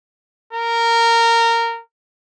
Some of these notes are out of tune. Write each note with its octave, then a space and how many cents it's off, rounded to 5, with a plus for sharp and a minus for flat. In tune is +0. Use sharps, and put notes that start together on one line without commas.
A#4 -15